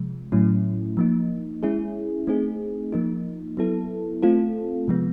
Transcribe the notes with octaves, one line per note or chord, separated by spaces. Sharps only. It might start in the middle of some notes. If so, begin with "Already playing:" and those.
Already playing: C3 F3 G#3
A2 F#3 A3 C#4 E4
F3 A#3 D#4
G#3 C#4 E4 G#4
A3 C4 D#4 G#4
F3 A#3 D#4
F#3 B3 E4 A4
A3 C4 F4 A4
C3 F3 G#3 B3